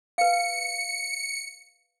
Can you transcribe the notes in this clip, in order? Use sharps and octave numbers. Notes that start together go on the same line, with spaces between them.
B4 F5 C#7